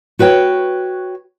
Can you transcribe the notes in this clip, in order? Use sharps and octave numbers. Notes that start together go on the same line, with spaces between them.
F#4 B4 C#5 G5